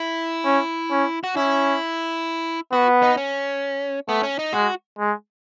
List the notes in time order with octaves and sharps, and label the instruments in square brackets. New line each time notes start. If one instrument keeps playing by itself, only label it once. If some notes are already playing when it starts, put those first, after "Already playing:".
Already playing: [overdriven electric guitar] E4
[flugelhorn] C#4
C#4
[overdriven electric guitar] F#4
[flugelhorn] C#4 [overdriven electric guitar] E4
[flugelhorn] B3 [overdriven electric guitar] F#4
[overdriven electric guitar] D#4
C#4
[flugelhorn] A3 [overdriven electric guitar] B3
[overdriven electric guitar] C#4
D#4
[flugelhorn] G#3 [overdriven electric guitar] F#4
[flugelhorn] G#3